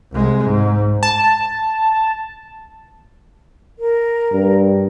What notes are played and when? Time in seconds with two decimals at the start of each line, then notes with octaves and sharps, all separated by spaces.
0.13 C2 G#3
0.45 G#2
1.03 A5
3.79 A#4
4.32 G2